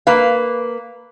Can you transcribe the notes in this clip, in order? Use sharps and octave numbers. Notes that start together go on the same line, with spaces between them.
A#3 B4 F5